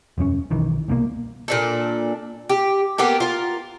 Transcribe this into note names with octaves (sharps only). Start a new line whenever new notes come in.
E1 F#2 A3 C#4
B1 D#3 E3
C2 B2 D3 A#3
A#2 D4 A4
G4
A#3 B3 G4 A4
F4 A#4